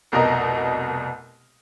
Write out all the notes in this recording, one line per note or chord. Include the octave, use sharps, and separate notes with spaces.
F1 C2 B2 A#4 D#5 A#5